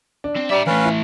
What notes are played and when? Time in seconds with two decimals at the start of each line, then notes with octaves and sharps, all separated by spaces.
0.24 D4
0.36 C4
0.50 G3 D5 E5 A#5
0.67 E3 A3 C#4 B4 F5
0.85 E4